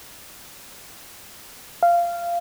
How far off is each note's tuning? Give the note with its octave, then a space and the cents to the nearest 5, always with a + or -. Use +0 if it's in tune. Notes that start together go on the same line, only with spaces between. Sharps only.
F5 -15